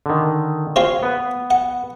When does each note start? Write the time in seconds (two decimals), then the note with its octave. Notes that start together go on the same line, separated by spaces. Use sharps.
0.06 D3 D#3
0.76 C4 F4 C#5 F5
1.03 B3 B4
1.51 F#5